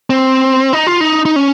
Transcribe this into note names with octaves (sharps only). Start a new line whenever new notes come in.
C4
D#4
F4
D#4
D#4
C#4